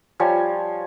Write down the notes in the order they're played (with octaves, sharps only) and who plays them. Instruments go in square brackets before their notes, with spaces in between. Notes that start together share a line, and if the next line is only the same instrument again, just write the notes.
[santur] F3 G3 C#5 G#5